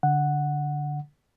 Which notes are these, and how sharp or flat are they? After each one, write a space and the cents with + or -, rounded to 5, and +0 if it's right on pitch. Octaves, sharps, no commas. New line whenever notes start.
D3 -10 F#5 +0